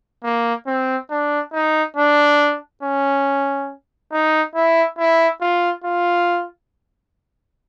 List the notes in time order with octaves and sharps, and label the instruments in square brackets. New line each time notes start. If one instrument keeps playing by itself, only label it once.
[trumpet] A#3
C4
D4
D#4
D4
C#4
D#4
E4
E4
F4
F4